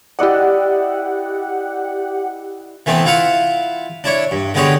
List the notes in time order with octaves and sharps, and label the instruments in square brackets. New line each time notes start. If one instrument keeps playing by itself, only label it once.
[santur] E4 D5 D#5 [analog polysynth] G4 F#5
[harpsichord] E3 A3 B3 C4
E4 F4 F5 F#5 B5
D4 E4 C#5
G2
D3 G#3 B3 G4 G#4 C#5